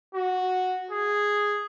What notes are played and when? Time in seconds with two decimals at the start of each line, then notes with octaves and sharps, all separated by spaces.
0.15 F#4
0.91 G#4